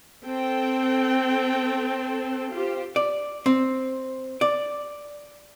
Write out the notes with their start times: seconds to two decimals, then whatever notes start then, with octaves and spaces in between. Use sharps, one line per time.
0.24 C4 A4 G5
2.52 F4 G4 C5
2.96 D5
3.46 C4
4.41 D5